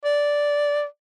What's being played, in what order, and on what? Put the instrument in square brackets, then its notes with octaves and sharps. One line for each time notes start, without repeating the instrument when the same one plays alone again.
[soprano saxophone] D5